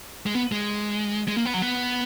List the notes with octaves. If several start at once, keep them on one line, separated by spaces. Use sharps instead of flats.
G#3
B3
G#3
G#3
A#3
B3
F#3
B3